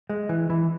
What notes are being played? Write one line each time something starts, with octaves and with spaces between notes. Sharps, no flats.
G#3
E3
E3